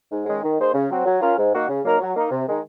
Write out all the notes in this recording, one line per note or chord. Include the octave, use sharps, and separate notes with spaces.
G#2
D#3 G#3 C#4
D#3
A#3 D#4 G#4 C5
C#3
F#3 C4 F#4
F#3
C#4 F4 A#4
G#2
D#3 A#3 D#4 F#4
C#3
F#3 A#3 D#4 A#4
F#3
A#3 D#4 A#4
C3
D#3 G#3 D#4